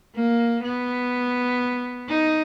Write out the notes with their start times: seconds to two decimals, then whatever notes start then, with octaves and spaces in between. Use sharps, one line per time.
0.15 A#3
0.63 B3
2.08 D#4